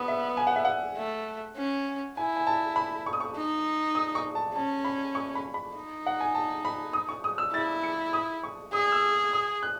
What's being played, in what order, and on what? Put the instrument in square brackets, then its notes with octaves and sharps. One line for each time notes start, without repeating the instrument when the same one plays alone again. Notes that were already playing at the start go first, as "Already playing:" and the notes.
Already playing: [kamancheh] B3 [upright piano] D#6
[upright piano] E5
G#5
F#5
E5
F#5
[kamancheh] A3
C#4
[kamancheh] E4 [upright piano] G#5
[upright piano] G#5
A5
B5
C#6
D#6
C#6
[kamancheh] D#4
[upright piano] D#6
C#6
A5
[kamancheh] C#4 [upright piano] A5
[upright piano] B5
C#6
B5
B5
[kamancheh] D#4
[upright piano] F#5
G#5
A5
B5
D#6
C#6
D#6
E6
[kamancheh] E4 [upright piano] A6
[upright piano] C#7
D#6
C#6
[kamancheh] G#4 [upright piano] D#6
[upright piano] E6
D#6
F#6